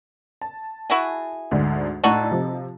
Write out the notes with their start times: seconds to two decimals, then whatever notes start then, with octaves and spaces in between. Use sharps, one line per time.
0.41 A5
0.90 E4 F#4 G#4
1.51 D2 G#2 D3
2.04 A2 D4 D#4 F#4 A4
2.31 C3 F3